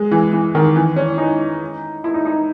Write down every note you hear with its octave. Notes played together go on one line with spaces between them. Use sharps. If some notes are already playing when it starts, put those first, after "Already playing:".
Already playing: G#3
E3
E3
D#3
E3
C#4
D#4
E4
D#4
D#4